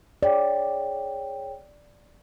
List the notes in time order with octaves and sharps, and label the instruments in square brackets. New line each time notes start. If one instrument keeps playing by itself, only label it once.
[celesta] G#4 C#5 G5 [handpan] D5